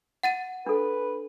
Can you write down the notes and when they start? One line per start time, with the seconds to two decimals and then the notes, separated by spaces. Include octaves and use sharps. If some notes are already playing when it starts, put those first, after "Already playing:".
0.23 F#5 A6 D#7
0.66 D4 A4 B4